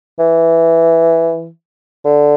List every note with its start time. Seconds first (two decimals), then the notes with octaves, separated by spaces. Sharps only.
0.19 E3
2.05 D3